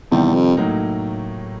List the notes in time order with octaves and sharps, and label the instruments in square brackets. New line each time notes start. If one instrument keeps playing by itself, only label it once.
[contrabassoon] E2 [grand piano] C3 D#3 G3
[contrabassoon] F2
[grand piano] A2 F#3 A#3 D#4